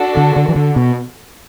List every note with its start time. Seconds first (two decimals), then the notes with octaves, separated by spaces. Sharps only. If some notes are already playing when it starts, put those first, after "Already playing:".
Already playing: D4 F#4 A4
0.17 D3
0.36 D3
0.49 E3
0.56 D3
0.76 B2